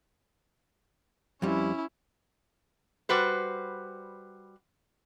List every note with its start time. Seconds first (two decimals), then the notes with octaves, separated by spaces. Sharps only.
1.42 F2 G3 C#4 E4
3.09 G3 F#4 B4 C5